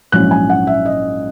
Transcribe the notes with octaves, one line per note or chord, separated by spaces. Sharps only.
A#1 G#2 F#3 C#4 E4 F#6
G#5
F#5
E5
D#5